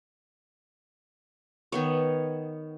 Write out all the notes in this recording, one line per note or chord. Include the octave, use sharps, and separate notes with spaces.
D#3 B3 C#5